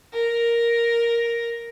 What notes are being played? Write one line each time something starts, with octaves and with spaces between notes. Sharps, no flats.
A#4